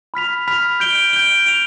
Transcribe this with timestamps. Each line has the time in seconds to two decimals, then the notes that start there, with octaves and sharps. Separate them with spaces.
0.14 B5 F6 B6 F7
0.48 B5 F6 B6 F7
0.80 G6 D7 G7
1.13 G6 D7 G7
1.46 G6 D7 F7